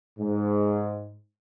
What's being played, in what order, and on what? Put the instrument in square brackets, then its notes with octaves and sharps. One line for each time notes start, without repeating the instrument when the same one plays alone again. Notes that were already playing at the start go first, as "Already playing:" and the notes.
[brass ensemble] G#2